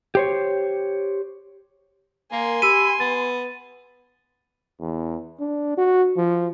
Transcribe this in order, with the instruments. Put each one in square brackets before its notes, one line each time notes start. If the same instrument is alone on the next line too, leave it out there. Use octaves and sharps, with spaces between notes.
[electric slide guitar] G4 C5 C#5
[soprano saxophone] A#3 [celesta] A#4 [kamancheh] G#5 C6
[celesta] G4 E6 [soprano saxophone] B5 [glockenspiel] D#7
[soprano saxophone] B3 [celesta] A6
[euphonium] E2
D4
F#4
F3